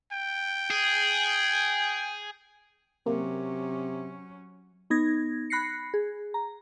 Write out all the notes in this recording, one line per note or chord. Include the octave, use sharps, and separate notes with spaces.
G5
G#4
C3 F#3 A#3 C#4
B3 D#4 G#6 A#6
B5 F#6 A#6 C7 C#7
G#4
A#5